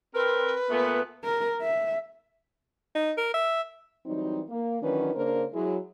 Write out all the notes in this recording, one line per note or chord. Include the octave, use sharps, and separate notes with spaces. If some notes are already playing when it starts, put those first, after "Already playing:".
C4 A#4 B4
A#2 A3 B3
A#4
E5
D#4
A#4
E5
E3 F#3 G3 C4 D#4
A#3
D#3 E3 F#3 C#4 D4 B4
C#3 A#3 D4 A#4 C5
F#3 G#3 E4